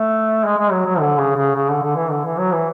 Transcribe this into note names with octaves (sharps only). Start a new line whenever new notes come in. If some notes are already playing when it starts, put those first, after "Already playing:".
Already playing: A3
G#3
G#3
F#3
F#3
D3
C#3
C#3
C#3
D3
D3
E3
D3
E3
F#3
E3